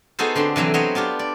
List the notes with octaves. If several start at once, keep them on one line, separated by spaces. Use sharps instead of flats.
B3 D#4 F#4 G#4 A4 C5
D3 C4 C6
C3 E3 F#3 C4
F#3 B3 C4 C5 C#5 D#5
B3 D4 F4 G4
D5